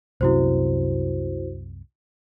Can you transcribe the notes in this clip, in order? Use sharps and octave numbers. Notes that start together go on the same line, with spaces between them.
C2 F#2 C3 E4 F#4 C5